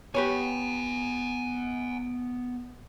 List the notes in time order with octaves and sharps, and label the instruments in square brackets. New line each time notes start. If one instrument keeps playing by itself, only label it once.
[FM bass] B3 [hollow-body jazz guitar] G4 B4 C#5 [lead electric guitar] F#5 G#5